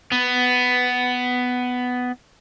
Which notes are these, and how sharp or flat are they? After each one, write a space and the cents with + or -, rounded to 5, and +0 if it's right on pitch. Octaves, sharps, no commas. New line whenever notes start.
B3 +10